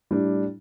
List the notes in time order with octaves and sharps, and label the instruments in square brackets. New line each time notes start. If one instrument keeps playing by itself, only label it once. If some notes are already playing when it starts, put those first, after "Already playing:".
[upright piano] A2 G3 D4